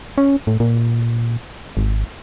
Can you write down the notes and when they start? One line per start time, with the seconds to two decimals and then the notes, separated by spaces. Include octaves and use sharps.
0.18 C#4
0.47 A2
0.60 A#2
1.77 G#1